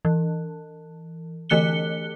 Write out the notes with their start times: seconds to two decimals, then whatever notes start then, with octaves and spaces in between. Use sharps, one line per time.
0.05 E3
1.50 D3 E3 A3 F#6 C#7 G7